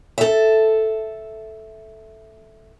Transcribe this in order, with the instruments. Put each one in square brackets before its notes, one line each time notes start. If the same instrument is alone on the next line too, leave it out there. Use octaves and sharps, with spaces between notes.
[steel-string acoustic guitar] A4 E5